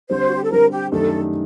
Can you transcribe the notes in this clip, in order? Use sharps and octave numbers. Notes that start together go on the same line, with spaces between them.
D3 G3 C4 C5
F#4
G4
A4
D3 G3 C4 A#4
G4
F#2 D#3 A3 D4 G4 A4